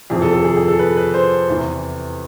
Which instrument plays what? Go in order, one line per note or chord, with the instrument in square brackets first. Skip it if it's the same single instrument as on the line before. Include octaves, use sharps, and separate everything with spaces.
[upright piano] F2 C3 E3 G#4
A4
A4
G#4
G#4
A4
B4
B4
C5
E2 C3 E3